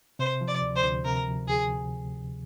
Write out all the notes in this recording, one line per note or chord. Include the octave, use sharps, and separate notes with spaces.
C3 C5
F3
D5
D2
C5
D2
C3 A#4
F3
D2 G#4
D2